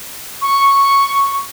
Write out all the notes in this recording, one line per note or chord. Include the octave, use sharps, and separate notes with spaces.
C#6